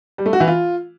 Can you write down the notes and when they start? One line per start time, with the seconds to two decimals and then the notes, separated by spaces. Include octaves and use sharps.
0.18 G3
0.26 A3
0.33 F#4
0.40 E3
0.48 F4